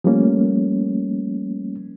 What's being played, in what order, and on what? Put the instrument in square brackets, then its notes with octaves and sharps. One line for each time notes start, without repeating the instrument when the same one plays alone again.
[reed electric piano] F3 G3 A3 A#3 C#4